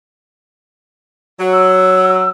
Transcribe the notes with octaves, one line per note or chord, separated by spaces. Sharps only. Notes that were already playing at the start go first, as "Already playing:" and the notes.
F#3
E6